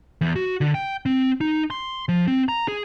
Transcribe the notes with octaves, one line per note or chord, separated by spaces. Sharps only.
E2
F#4
D3
G5
C4
D#4
C6
F3
C4
A#5
G#4